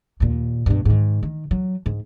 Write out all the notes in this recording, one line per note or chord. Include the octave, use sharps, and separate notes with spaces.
D#2 A#2
G2 B2
G#2 D#3
D#3
F#3
G#2